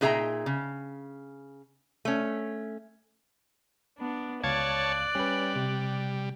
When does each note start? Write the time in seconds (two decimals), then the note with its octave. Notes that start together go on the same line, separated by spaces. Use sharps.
0.01 A#2 D#4 G#4 E5 G5 A#5
0.46 C#3
2.05 A3 C#4
3.99 B3 D4
4.44 C#2 C#5 D5 F5 A5 F#6 G#6
5.15 G3 C#4 B4
5.56 C3